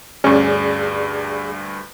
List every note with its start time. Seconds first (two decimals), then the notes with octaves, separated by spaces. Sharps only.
0.24 D2 G2 C#4 G#4 D5